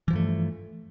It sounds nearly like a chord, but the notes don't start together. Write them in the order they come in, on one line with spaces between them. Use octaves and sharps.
E3 F3 G2 A3